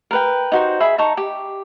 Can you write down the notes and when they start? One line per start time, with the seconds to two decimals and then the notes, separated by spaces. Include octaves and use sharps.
0.11 A#4 B4 G5
0.52 D#4 F#4 C5
0.80 G#4 E5 B5
0.98 D#4 A5 A#5 C#6
1.17 G4